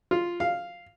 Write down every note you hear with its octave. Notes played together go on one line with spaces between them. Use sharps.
F4
F5